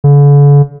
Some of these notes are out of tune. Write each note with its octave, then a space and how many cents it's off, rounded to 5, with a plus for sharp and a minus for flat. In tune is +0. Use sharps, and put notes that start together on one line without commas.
D3 -45